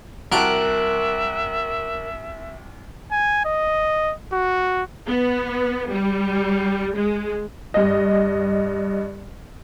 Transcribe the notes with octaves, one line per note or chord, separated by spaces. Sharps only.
C2 F#4 A#4 E5 A5 F#6 D7
G#5
D#5
F#4
B3
G3
G#3
G2 D#5